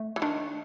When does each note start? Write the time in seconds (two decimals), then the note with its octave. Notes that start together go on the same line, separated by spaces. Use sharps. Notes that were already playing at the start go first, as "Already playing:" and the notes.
Already playing: A3
0.16 E3
0.22 D#3 D4